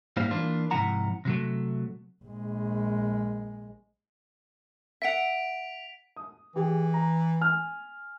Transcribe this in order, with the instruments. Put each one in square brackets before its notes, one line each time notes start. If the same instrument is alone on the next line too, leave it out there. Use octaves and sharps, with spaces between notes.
[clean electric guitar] G#2 G3 A#3 E4 C5 F5
E3 A#3 D4 F4
G#2 C3 F3 E4 F#5 A#5
C3 F#3 A3
[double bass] A#1 G#3
[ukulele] E5 F#5 [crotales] B6 D7 F7
[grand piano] D#6
[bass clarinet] E3 [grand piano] G4 G#4
[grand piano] A#5
G#5 F6